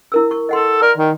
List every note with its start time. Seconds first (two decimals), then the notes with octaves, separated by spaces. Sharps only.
0.12 E4 A#4 E6
0.31 C#6
0.49 A4 D#5 F#5 C6
0.82 A#4 D5
0.98 D#3